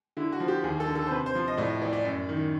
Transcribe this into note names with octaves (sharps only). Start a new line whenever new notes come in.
D3 E4
F#4
F3
G4
D#2 G#4
A4
D3
A4
C5
C3 B4
C5
F3
D#5
A2 D5
D#5
E3 D5
D5
F#2 D5
D#3